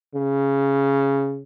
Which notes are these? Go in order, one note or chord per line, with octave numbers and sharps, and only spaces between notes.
C#3